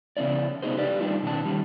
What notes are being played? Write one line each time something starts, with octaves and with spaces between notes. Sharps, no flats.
C#3 B3 C#4 E4 D5
C3 B3 D#4 G#4 C5
D3 G4 B4 D5
G3 A3 D4 D#4 F4
B2 D#3 C#4 A5
D#3 G3